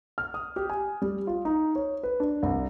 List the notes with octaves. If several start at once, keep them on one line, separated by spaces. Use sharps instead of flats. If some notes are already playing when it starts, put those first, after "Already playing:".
F6
D#6
G4
G#5
G3
F4
D#4
C#5
B4
D4
C2